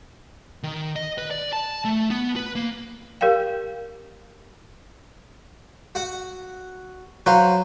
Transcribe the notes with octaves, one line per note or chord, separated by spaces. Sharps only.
D#3
D#5
B4
D5
A5
A3
B3
B4
A#3
G4 A#4 D5 F5 G5
F#4 F#5
F#3 B4 C5 F5